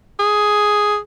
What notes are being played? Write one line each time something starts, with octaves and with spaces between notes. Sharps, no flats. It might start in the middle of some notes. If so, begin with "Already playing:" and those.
G#4